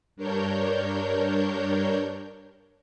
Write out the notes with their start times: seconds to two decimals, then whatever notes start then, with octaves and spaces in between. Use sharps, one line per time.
0.16 G2 D4 A#4 C#5 G6